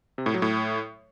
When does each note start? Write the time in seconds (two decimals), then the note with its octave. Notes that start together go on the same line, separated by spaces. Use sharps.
0.18 C3
0.26 A2
0.34 F#3
0.42 A2